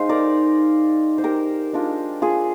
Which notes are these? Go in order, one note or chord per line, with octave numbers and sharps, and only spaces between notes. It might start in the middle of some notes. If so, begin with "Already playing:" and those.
Already playing: G#3 D#4 C5 F5
A#4 D5
C5
G4 A#4
G#3 D4 F4
F4 G#4